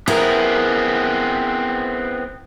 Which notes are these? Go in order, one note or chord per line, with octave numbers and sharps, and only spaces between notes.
B3 C4 E4 G#4 A#4